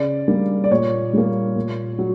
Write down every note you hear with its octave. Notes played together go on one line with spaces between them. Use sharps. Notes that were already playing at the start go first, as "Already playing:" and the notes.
Already playing: C#3 D5
G3 A#3
D5
A#2 C#5
G3 A#3
A#2
F#3